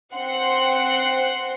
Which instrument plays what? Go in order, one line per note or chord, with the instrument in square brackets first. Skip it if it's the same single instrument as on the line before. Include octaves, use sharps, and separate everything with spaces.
[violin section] C4 F#5 C6